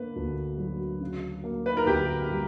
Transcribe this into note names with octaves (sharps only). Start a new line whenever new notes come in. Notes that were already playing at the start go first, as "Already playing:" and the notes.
Already playing: D3 A#3 B4
D2
F#3
C#3
A#3
B4
A#4
D2 G4
G3